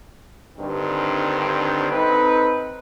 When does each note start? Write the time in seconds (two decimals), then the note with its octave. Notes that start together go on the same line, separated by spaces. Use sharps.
0.58 G2 D3 D#3 C4
1.92 C4 D#4 A4 B4